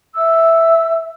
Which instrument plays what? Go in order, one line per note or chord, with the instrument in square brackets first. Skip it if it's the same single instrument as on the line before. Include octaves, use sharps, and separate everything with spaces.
[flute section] E5 E6